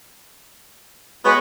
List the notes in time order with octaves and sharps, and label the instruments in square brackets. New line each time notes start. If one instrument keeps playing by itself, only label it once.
[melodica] G#3 F#4 C#5 [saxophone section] B3